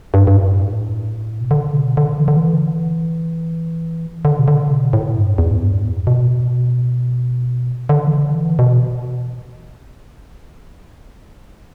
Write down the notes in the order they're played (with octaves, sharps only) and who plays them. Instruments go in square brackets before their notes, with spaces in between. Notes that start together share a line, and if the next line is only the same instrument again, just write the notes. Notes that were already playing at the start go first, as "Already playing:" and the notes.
[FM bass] G2
G2
A2
B2
D3
B2
D3
E3
D3
E3
D3
B2
D3
B2
A2
G2
E2
A2
G2
A2
B2
D3
E3
D3
E3
B2